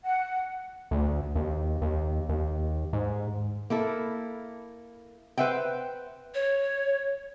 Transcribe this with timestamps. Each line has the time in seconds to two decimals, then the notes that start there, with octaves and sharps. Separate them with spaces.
0.03 F#5
0.91 D2
1.35 D#2
1.82 D#2
2.29 D#2
2.93 G#2
3.70 A#3 E4 A4
5.38 B4 C5 E5 F#5 G5
6.35 C#5